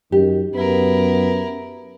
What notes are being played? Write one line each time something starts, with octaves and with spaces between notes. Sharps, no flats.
F#2 D#3 G4
F#2 B3 E4 A#4